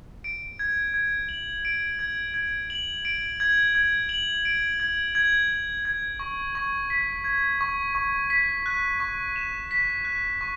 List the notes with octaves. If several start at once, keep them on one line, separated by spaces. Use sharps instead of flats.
D7
G#6
G#6
F#7
D7
G#6
G#6
F#7
D7
G#6
G#6
F#7
D7
G#6
G#6
F#7
G#6
C#6
C#6
B6
G#6
C#6
C#6
B6
F#6
C#6
E7
B6
F#6
C#6